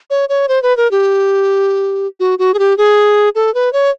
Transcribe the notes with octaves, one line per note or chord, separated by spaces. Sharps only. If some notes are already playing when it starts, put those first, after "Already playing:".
C#5
C#5
C5
B4
A#4
G4
F#4
F#4
G#4
G4
G#4
A4
B4
C#5